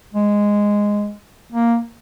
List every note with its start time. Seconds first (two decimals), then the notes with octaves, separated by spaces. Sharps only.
0.14 G#3
1.52 A#3